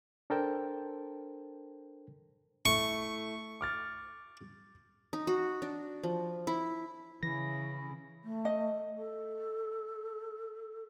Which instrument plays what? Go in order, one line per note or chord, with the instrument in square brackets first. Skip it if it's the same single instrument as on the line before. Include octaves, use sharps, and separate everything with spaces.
[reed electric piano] D4 A4 A#4 C5 G5 A5
[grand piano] A3 E4 [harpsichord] C#6
[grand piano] D6 F6 A6
[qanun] D#4
F#4
D4
F3
E4
[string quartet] C#3 [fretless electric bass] E3 [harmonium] C#4 E4 [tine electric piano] A#6
[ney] A3
[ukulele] D#5
[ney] A4